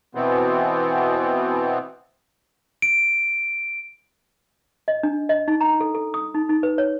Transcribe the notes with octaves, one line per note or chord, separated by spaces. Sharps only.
B2 E3 B3 C4
D7
D#5
D4
D#5
D#4
A#5
A4
A4
D#6
D#4
D#4
B4
C#5